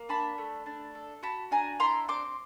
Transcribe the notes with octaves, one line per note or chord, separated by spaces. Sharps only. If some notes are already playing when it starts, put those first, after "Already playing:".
Already playing: A#3
D4 A5 B5
A3
D4
A4
F#4 A5 B5
D4 G#5 A#5
E4 A#5 C6
C4 C6 D6